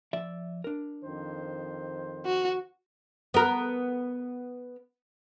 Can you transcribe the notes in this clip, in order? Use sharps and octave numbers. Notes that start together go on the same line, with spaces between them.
F3 D5 E5
D4 A#4
F2 D#3 C5
F#4
B3 A#4